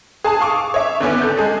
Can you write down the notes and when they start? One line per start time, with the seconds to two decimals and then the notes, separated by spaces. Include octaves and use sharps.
0.24 G#4 A5 D#6
0.41 F5 C#6 D6
0.74 C#5 E5
1.01 G#1 D3 B3 C#4
1.21 A4 G6
1.37 G#3 G#4 A4